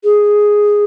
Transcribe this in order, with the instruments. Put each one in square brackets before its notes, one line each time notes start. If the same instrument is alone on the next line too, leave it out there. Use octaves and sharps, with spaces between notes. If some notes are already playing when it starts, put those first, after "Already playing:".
[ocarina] G#4